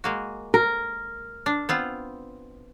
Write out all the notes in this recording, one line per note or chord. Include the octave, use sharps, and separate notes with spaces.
G#3 A#3 F#4
A#4
D4
B3 C4 F4